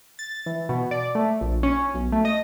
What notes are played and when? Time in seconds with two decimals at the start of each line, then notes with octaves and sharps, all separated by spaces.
0.19 A6
0.46 E3
0.69 B2
0.91 D5
1.15 A3
1.41 A#1
1.63 C#4
1.94 B1
2.12 A3
2.25 D#5